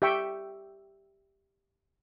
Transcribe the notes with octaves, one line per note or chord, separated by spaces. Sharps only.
G4 E5 G5 C#6